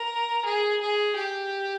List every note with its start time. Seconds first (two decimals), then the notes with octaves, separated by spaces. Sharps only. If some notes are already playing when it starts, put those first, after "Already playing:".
Already playing: A#4
0.45 G#4
0.81 G#4
1.16 G4